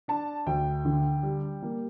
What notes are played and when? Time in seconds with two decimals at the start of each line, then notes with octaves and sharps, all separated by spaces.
0.08 D4 A5
0.46 D2 G5
0.85 D3
1.23 G3
1.62 A#3